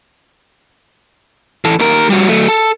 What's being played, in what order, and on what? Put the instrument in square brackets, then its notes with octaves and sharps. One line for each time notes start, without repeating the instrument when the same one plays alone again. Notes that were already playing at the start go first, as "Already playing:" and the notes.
[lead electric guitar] E3 A4
D#2 A#4
G3 F#4
F#3 A3
A4